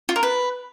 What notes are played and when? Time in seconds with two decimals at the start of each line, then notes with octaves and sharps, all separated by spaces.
0.09 F4
0.16 A#4
0.23 B4